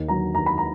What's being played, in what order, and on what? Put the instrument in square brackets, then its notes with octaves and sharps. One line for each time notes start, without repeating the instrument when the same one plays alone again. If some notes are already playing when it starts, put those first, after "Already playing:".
Already playing: [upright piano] D#2
D3 F#3 A#5
D#2 A#5
B5
A#5